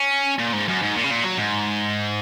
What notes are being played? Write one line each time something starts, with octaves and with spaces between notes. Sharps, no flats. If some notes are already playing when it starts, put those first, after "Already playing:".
Already playing: C#4
A#2
G#2
F#2
G#2
A#2
C#3
A#2
F#3
G#2